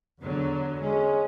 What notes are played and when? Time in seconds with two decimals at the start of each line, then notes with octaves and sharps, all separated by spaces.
0.21 E2 D3 F#3
0.82 G#3 C#4